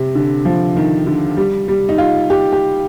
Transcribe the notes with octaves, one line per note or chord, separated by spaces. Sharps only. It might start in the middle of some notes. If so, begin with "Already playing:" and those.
Already playing: C3
D3
F3
D#3
D3
G3
G3
D#4
F4
G4
G4